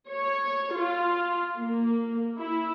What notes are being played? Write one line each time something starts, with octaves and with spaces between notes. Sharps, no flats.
C#5
F4
A#3
E4